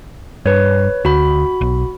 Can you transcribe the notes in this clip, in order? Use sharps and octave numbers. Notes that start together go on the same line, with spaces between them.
G2 B4 C#5
D2 F#4 B5
B1